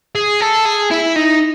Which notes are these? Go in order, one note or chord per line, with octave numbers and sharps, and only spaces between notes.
G#4
A4
G#4
E4
D#4